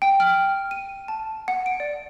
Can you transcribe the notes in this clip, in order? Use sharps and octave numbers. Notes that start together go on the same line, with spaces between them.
G5
F6
D#7
A5
F#5
D7
D5